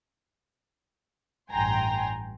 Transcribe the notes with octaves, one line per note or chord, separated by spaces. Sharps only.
A1 G2 G5 G#5 A#5 C6